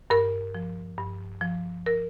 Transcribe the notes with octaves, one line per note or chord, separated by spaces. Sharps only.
G2 A#4
F3
G2
F3
A#4